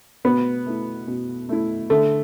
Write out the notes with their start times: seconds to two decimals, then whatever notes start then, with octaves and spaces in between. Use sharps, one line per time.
0.24 B2 B3
0.66 A3 E4
1.07 B2
1.49 A3 E4
1.90 D3 A3